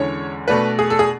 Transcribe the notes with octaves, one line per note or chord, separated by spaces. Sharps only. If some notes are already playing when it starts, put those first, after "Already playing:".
Already playing: E2 D3 G#3 C#4 C#5
B2 A3 D4 B4
G#4
A4
G#4